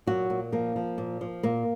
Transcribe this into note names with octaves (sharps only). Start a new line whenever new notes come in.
A#2 F#3 F#4
A#2
F3 A#3
F3
A#2
F3
A#2 A#3